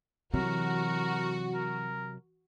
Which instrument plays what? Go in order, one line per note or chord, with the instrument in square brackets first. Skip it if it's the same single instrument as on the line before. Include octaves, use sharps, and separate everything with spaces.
[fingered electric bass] C3 F#3 [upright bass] E3 [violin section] F#4 [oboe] A#4
[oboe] A#4